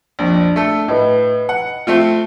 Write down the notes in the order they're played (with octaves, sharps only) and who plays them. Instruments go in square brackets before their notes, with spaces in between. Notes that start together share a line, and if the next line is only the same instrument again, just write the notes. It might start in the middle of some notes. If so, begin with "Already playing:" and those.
[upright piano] A#1 F2 [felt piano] D4
[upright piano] A3 A4
[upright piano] A2 [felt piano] B4 D#5
[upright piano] F#5
A3 C4 F4